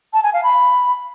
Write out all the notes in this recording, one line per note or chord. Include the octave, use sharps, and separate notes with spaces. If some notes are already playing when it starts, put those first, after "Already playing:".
A5
G#5
F5
B5